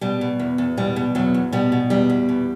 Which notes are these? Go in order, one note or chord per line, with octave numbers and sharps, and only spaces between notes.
B2 G3
B2
E2
E2
B2 G3
B2
E2 F#3
E2
B2 G3
B2
E2 G3
E2
B2